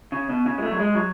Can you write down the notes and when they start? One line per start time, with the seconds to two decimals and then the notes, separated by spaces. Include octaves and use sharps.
0.12 C#3
0.30 B2
0.46 C#3
0.58 G#3
0.63 A3
0.71 F#3
0.80 G#3
0.95 F#3